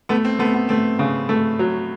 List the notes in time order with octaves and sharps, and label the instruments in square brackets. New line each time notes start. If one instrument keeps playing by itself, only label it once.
[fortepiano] A3 [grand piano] B3
[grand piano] C4
[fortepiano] A3 [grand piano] B3
[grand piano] B3
[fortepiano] A3 [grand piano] C4
[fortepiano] C#3
A3
F#3